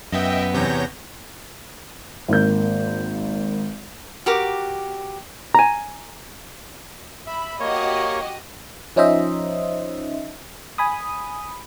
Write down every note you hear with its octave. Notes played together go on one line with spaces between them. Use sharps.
F#2 B3 D#5 E5 G5
E2 C3 C#5 G6 A#6
G#1 A#3 G6
F#4 G4 A#4 D6
G#5 A#5
E5 B5
A#3 F#4 G4 C#5 D#5
F3 C#4 D#4 C5 D#5 E5
G#5 B5 D#6